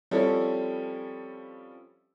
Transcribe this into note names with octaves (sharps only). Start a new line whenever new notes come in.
F3 G3 C4 C#4 E4 A4